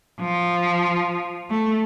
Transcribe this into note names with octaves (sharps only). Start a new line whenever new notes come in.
F3
A3